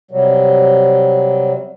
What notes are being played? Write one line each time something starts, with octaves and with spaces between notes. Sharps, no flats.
C3 F#3 G3